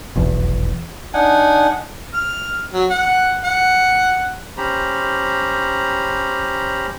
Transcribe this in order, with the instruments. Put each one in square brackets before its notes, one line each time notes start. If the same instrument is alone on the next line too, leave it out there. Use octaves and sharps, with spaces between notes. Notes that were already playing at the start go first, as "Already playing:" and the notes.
[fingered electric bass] F1 B1 E2
[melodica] D4 D#4 F#5 G#5
[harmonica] F6
F#3
F#5
F#5
[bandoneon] C#4 G4 C5 A#5 B5